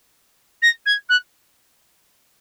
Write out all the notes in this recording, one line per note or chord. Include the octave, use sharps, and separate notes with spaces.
A#6
G#6
F#6